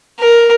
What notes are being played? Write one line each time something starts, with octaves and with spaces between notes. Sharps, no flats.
A#4